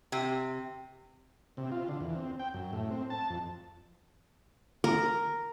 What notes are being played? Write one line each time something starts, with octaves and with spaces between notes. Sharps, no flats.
C3
C3
F4
D3
E2
C4
G5
F#2
A2
C4
A5
F2
A#4